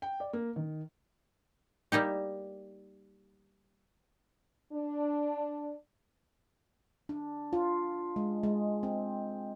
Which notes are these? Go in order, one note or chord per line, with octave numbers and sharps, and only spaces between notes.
G5
D5
A#3
D#3
G3 A#3 D#4 G4
D4
D4
F4
G#3
G#3
C4